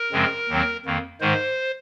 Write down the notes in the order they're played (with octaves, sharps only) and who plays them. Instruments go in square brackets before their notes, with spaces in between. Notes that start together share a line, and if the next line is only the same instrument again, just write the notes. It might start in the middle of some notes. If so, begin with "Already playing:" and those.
Already playing: [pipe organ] A#4
F#2 C#3 F3 G#3 C4
D#2 D#3 F#3 C4
F2 D#3 A#3
G#2 D#3 G#3 C5